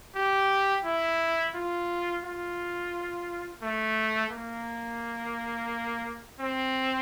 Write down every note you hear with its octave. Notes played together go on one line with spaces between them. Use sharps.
G4
E4
F4
F4
A3
A#3
C4